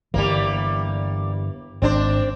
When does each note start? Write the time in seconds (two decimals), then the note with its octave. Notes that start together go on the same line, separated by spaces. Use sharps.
0.14 G1 E3 G3 A#3
1.82 G#1 C4 D4 C5